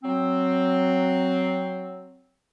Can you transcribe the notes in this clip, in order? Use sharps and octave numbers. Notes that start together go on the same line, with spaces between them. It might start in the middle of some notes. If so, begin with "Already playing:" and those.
F#3 C4